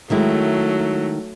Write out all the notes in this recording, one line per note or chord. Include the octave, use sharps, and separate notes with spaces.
D#3 F#3 G#3 A3 E4